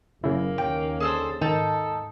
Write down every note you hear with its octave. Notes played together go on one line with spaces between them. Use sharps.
F#1 C#3 A#3 E4
D#2 C#4 G5
D3 G#4 A4 C5
G#2 D#3 D#4 A4 A5 G6